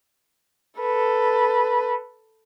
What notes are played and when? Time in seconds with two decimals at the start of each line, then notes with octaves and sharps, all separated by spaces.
0.81 A4 B4